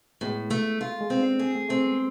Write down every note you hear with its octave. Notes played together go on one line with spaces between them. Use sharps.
A2 G#3 B3
A3
A3 F4
G#3
C4
B3 D4
A3 G#4
A3 C4
A3 C4
G#3 B3